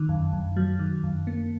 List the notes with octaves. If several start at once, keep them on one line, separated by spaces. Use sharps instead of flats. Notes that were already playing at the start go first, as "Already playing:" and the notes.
Already playing: D#3
F#2
F#2
F#3
D#3
F#2
A#3